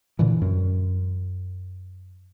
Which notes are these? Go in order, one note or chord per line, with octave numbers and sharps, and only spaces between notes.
A#2 D3 E3
F#2